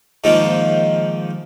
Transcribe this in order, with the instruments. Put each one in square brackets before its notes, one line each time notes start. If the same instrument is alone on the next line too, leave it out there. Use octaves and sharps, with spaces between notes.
[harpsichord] G#2 D#3 F3 A#3